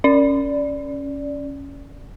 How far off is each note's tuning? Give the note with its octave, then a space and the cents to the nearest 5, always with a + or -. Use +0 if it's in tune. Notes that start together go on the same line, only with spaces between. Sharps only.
C#4 +0 D5 -5